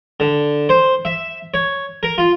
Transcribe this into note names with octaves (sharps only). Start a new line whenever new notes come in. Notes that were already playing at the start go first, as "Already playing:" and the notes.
D3
C5
E5
C#5
A#4
F4